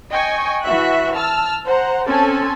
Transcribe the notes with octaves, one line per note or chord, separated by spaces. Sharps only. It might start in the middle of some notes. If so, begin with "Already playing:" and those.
D#5 G5 G#5 C#6
E3 F#4 E5 F#6
A5 E6 F6
C5 F#5 A#5
C4 C#4 A4 G#5 A5